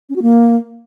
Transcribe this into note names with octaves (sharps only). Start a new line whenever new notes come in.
C#4
F#4
A#3